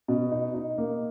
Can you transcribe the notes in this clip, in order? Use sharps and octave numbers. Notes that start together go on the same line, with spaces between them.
B2
D#4
D#4
A#3